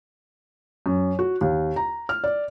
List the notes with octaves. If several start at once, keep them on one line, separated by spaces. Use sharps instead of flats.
F#2
F#4
D#2
A#5
F6
D5